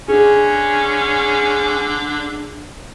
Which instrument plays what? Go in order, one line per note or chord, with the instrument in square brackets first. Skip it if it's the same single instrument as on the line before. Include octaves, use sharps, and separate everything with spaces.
[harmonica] D3 [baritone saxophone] C#4 [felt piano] G#4